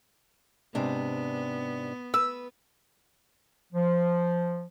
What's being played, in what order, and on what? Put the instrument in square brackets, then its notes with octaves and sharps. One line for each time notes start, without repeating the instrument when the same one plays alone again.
[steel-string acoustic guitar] G#2 C3 D4 [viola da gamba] B3
[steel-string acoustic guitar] B4 [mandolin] E6
[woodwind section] F3